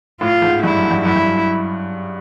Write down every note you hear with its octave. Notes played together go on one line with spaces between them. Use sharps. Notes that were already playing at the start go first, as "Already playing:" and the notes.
A2 F4
G#2
G2 E4
F#2
G2
F#2 E4
G2
F#2